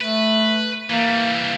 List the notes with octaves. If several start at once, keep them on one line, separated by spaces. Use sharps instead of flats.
A3 B4
E3 G3 A#3